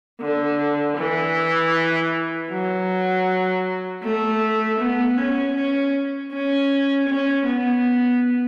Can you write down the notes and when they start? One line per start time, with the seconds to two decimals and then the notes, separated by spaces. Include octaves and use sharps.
0.21 D3
0.98 E3
2.51 F#3
4.03 A3
4.80 B3
5.17 C#4
5.56 C#4
6.32 C#4
7.09 C#4
7.47 B3